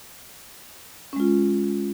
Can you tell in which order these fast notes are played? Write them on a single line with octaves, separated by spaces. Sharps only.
C#4 G#3 F4